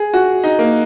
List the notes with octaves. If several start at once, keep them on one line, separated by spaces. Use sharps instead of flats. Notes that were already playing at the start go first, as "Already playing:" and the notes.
Already playing: G#4
F#4
D#4
A#3